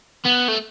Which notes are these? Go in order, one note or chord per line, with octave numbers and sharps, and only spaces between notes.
B3
A3